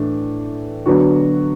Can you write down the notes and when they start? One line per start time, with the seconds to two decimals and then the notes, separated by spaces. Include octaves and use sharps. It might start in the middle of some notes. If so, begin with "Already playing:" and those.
Already playing: A2 E3 A3 D4
0.86 D3 F#3 B3 D4 F#4